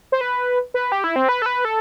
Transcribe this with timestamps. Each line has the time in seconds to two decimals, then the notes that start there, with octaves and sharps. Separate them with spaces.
0.12 C5
0.21 B4
0.74 B4
0.92 G4
1.04 E4
1.16 C4
1.29 B4
1.42 A4
1.46 B4
1.65 A4